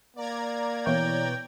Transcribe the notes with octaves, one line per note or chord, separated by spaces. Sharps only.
A#3 D5 A#5 G#6
B2 E3 C#5 G5